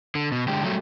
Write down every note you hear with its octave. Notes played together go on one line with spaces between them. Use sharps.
D3
B2
D3 G#3 G4
F#3 G3 A3